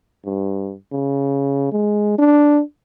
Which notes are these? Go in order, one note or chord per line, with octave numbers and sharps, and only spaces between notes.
G2
C#3
G#3
D4